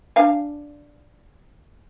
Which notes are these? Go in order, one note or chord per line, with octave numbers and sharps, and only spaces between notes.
D4 F5 G#5